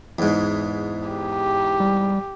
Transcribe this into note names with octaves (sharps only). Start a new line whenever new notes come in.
E2 G#2
G4
G3